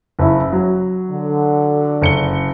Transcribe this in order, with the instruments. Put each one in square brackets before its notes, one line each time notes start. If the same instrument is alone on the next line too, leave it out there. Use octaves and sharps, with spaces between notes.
[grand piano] F#1 E4
F#3
[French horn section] D3
[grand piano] F#1 C#7 G7